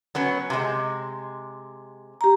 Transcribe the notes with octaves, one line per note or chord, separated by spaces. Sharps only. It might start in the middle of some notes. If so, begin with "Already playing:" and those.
F#3 B3 C#4
C3 G#3
G4 A#5